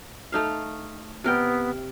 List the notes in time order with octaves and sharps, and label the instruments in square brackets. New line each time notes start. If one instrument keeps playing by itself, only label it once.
[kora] A3 D#4 F5
[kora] C3 A#4 G5 [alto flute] B3